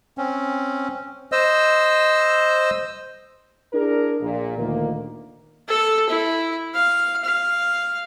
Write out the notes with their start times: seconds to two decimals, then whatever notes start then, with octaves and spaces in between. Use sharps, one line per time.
0.18 C4 C#4
1.32 C5 D#5 E6
3.73 D4 E4 G#4 A#4
4.21 A#1 A#2
4.57 D2 A#2 D#3 A#3
5.68 A4
6.09 E4
6.74 F5
7.24 F5